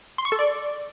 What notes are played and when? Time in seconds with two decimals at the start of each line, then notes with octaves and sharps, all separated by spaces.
0.18 C6
0.25 C#6
0.32 A4
0.39 D5